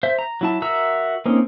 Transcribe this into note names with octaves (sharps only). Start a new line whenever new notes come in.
C5 E5
A#5
F#3 E4 A5
F#4 A#4 E5 A#5 E6
A#3 C4 C#4 D#4